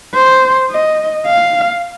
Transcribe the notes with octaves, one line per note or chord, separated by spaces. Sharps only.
C5
D#5
F5